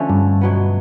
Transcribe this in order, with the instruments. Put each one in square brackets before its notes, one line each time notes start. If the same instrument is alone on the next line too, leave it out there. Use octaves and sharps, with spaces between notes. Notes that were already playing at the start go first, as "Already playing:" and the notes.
Already playing: [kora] D3 F3 A3 C#4
[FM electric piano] G2
[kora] B2 F#3 B3